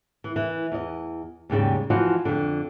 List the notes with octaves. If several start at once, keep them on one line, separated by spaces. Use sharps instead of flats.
E3
E3
E2 D#5
D#2 G#2 C#3 G3
E3 F3 F4 F#4 D#5
F2 D3